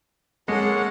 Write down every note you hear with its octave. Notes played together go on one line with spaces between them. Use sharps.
G#3 A#3 A4 C#5 F#5